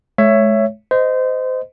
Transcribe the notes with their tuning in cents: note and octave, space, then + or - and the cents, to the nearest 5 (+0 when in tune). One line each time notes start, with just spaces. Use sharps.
G#3 +40 C#5 +0 E5 +15
C5 -25 D#5 +0